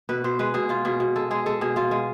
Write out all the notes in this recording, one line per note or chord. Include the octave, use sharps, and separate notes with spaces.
B2 B4
B2 C5
G#3 B4
B2 G#4
B2 F4
B2 G#4
B2
G#3 A4
G#3 G#4
G#3 A4
B2 G#4
B2 F4
G#3